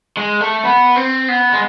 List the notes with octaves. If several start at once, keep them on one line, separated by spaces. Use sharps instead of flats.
G#3
A3
B3
C4
B3
G#3